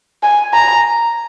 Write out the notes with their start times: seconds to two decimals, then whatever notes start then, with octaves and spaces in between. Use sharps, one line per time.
0.23 G#5
0.54 A#5